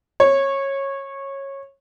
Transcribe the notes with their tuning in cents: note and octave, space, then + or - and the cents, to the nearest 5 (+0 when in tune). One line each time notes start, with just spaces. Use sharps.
C#5 -20